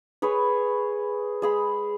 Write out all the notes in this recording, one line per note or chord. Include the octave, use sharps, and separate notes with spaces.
G#4 B4 C#5
G#3 G#4 B5